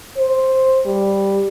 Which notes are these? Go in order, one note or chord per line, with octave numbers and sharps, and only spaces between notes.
C5
G3